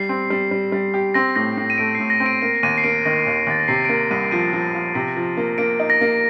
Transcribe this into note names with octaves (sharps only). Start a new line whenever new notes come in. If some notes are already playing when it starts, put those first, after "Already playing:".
Already playing: G3 C7
C4
G3
G3
G3
G4
C4 A#6
A2 A#6
A2 C7
D#7
A3 D7
C7
A2
A#6
C4
D7
A#3 D7
D#2 D#7
C7
A#3 D7
D#3 A#6
D#2
D#2 A6
A#6
C3 C7
D7
A#3 C7
C2 D#7
F3 D#7
F3
F3
C3
F3
A#3
A#3 D7
D#4
A#6
A#3